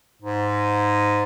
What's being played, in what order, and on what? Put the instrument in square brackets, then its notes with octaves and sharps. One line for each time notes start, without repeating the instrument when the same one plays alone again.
[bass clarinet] G#2